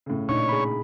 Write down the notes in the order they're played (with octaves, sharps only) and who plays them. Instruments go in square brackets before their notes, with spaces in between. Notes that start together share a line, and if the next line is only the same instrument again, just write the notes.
[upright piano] A2 C#3
[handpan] A#2 D4 D#4 [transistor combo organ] C#5
[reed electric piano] G#4 B5